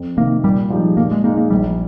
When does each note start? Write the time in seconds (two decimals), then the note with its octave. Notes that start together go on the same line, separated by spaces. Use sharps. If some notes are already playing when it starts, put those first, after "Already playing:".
Already playing: F2
0.17 C3 D#3 A#3
0.44 A#2 G3
0.70 F3 G#3 D#4 G4
0.97 A#2 A#3
1.11 G#3
1.24 G#3 A#3 D#4
1.37 A#3
1.50 A#1 G3